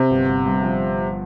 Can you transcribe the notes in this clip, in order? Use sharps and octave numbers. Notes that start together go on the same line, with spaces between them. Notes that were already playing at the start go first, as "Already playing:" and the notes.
Already playing: C3
G1
G1
G2
F3